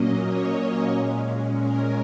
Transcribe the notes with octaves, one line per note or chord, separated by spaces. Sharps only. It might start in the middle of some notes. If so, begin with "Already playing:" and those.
Already playing: A#2 F#3 A#3 C#4 D#5
C#5
A#2 G#3 C#4
A#4